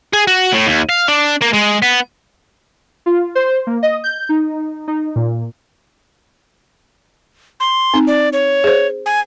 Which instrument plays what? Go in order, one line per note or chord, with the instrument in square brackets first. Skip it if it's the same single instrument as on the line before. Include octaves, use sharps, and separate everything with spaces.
[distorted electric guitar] G#4
F#4
A2
D#2
F5
D4
A#3
G#3
B3
[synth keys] F4
C5
A#3
D#5
G6
D#4
D#4
A#2
[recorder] C6
[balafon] C4 D#4
[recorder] D5
C#5
[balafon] G#4 C5
[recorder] G#5